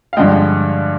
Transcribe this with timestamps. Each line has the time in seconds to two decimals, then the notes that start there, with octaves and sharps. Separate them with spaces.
0.13 F5
0.17 G2 D3 F3 G#3 D#5 G5